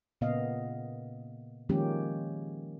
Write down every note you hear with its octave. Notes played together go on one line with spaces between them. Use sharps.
A#2 C#3 A#3 B3 D#5 F5
D#3 F3 G#3 A#3 C#4 G4